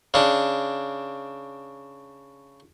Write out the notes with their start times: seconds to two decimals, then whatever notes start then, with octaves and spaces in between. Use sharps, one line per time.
0.14 C#3 D4